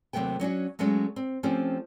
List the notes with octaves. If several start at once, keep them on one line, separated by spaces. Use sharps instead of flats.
D#2 C3 F#3 A3 B3 G5
F#3 C#4 D4 F#4
F#3 G#3 A3 B3 C#4
C4
F3 A3 C4 C#4 G4